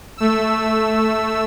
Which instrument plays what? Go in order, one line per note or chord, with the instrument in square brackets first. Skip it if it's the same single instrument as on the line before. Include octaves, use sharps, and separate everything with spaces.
[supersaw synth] A3 E6